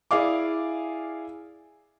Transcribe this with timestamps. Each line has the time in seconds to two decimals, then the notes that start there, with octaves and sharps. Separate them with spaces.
0.11 E4 G#4 D5 F5 D6